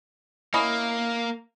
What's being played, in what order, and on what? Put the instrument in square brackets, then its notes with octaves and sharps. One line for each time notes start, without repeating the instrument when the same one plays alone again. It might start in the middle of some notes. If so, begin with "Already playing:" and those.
[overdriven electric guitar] A#3 [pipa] C#4 E4 D#5